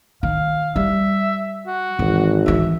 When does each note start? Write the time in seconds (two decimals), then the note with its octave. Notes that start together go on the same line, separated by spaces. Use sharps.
0.23 D#3 F5
0.76 G3 E5
1.67 F#4
1.99 G#1 E3
2.46 E3 C4 E5